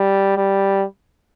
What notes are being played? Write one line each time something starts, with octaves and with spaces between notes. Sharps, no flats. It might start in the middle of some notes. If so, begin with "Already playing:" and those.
Already playing: G3
G3